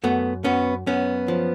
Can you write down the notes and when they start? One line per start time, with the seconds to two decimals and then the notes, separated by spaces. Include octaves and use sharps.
0.03 F#2 A3 B3
0.44 F#2 B3 C#4
0.86 F#2 B3 C#4
1.28 F3